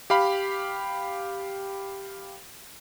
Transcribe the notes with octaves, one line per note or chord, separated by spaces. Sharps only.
G4 F5 B5